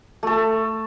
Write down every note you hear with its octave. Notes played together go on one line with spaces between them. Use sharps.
A3 A4